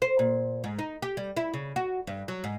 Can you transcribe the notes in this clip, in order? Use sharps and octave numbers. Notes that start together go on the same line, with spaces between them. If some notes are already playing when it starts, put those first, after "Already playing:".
C5
A#2
G#2
D#4
G4
G3
E4
C#3
F#4
G2
F#3
G#2